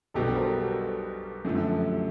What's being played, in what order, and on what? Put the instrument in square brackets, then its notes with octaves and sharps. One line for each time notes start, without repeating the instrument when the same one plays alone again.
[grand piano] B1 B2 G3 B3 D4 [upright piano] G4 A4
[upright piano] A#4 C5
A4 B4
[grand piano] F#2 D3 F3 A3 [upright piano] G4 A4